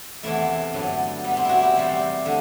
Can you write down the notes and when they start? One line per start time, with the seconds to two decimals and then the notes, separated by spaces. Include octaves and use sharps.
0.23 E2 C3 E3 A3 E4
0.73 G2 D3 F#3 A3
1.24 B2 G3 B3
1.37 C4
1.44 E4 F#4
1.62 G4
1.75 E2 C3 G3
2.25 D3 A3